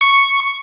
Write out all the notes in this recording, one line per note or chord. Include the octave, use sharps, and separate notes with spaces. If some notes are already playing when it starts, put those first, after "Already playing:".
C#6